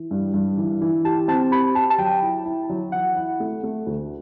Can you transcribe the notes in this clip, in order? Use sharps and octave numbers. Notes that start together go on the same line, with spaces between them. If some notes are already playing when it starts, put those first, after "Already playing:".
Already playing: E3
G2
G2
E3
E3
G4 A5
C4 A5
G4 B5
G4 A5
A5
F#3 G5
E4
E4
F#3
E3 F#5
E4
A3
A3
D2